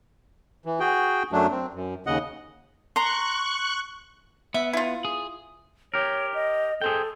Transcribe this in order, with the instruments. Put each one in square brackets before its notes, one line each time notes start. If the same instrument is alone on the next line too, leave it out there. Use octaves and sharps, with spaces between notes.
[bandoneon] E3
F#4 G#4 G5
F#2 F#3 A3 D4
C4
F#2
D#2 C#3 D#5 F#5
[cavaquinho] A#5 C6 [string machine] C#6 F#6
[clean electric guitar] B3 [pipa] E5
[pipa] E4 F4
[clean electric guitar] G#4
[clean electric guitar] G4 A#4 [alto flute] C#5
[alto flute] D#5
[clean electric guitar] G#4 C5 G5 [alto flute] A4